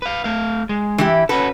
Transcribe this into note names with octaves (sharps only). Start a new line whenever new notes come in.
B4 F5
A3 F5
G#3
E3 E4 G4
C#4 F#4 A4 B4